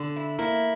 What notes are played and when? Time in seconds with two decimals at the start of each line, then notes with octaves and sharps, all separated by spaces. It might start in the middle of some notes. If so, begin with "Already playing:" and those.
Already playing: D3
0.16 E4
0.39 A#3 E4